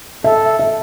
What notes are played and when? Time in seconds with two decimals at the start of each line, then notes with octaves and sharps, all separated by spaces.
0.24 A4 E5
0.59 E5